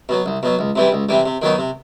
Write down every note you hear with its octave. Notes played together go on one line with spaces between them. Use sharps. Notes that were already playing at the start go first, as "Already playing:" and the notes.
B2 F#3
C2
B2 F#3
C#2
C3 E3 G3
C#2
C3 E3 G3
C3
D#3 F#3 B3 D#4
C3